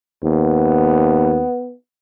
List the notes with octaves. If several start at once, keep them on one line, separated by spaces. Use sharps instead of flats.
D#2 B3